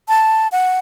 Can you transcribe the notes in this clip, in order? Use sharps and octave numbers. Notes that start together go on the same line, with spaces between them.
A5
F#5